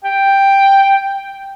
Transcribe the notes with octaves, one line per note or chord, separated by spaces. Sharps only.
G5